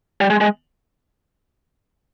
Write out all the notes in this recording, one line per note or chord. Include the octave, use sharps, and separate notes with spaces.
G3
G#3
G#3